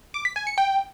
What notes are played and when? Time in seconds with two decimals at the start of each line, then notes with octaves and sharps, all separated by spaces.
0.14 D6
0.25 B6
0.36 G#5
0.47 C#7
0.58 G5